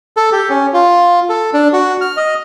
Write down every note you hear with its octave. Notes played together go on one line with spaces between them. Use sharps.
A4
G4
C#4
F4
A4
D4
F#4
F6
D#5